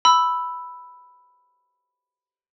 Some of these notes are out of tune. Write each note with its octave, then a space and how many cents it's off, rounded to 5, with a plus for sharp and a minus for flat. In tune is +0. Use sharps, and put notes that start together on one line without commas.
B5 +0 E6 +0